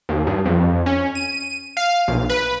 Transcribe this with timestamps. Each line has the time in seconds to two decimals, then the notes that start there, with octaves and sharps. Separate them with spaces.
0.09 D#2
0.27 G2
0.46 F2
0.86 C#4
1.15 D#7
1.77 F5
2.08 B1
2.30 B4